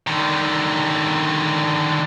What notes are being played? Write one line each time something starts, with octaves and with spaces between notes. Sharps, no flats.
D3 D#3